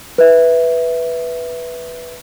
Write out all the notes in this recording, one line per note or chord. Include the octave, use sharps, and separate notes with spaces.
B4 E5